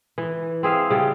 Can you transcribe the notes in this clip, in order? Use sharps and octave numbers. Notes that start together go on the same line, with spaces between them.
E3
C4 G#4 E5 F5
C#3 G3